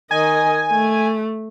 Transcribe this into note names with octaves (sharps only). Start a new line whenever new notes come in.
D#3 D#5 G#5
A3